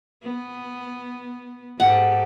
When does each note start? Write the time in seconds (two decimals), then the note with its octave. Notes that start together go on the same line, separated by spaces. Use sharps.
0.23 B3
1.80 G#2 G4 A4 F#5